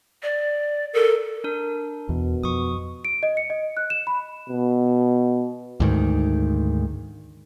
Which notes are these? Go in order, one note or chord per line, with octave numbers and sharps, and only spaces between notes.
D5
A4 A#4
D4 A#4
E2 B2
F2 C#6 D#6
D7
D#5
C#7
D#5
F#6
E7
B5
B2
D2 G#2 D#3